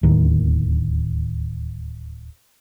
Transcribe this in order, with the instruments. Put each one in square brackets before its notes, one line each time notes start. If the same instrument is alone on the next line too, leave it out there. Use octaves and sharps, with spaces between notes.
[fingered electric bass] D1 D#2 A2 D#3